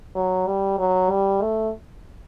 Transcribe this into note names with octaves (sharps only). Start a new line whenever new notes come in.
F#3
G3
F#3
G3
A3